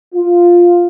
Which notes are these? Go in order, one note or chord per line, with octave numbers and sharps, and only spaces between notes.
F4